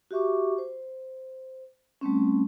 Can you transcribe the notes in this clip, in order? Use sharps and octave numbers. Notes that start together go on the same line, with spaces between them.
F#4 G4 E5 C#6 D6
C5
G3 A3 C4 C#4